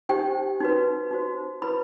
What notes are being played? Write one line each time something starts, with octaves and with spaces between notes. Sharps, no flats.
D#4 G4 C5 G5
D#4 F#4 B4
D#4 F#4 C5
E4 B4 B5